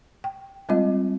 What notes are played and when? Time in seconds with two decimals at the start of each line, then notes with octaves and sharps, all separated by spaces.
0.24 G5
0.69 G3 G#3 C4 F4 D#5